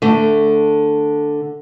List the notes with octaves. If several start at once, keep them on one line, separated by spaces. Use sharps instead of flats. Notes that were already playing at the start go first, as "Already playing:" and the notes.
D3 A3